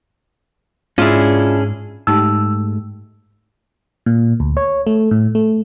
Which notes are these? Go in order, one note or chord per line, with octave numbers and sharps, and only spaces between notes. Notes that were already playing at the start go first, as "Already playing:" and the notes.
G#2 C#4 D4 E4 F4 G#4
G#2 G#3 A3 D#4 G4 G5 E6
A#2
D2
C#5
A3
A2
A3